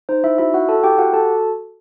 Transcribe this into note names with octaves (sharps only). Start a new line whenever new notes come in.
D#4 C5
D#4 E4 E5
E4 F#4 E5
F#4 F#5
A4 A5
E4 G4 G5
F#4 G4 F#5
F#4 A4 A5